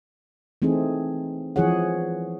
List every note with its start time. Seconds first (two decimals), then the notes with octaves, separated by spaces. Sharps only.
0.62 E3 A3 C4 D#4 G#4
1.56 E3 F3 E4 G#4 C#5 F#5